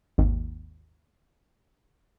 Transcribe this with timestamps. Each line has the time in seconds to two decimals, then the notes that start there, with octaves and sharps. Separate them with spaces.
0.18 G#1 D#2